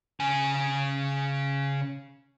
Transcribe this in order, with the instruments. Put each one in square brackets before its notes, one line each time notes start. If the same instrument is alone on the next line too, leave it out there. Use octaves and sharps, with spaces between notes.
[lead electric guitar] C#3 G#5